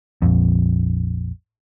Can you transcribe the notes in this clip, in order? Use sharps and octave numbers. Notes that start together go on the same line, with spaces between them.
A#1 F2